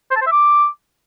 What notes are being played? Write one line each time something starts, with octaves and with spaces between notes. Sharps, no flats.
C5
A5
C5
E5
D6